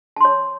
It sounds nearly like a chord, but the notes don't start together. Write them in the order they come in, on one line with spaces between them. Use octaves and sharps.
A5 C6 C#5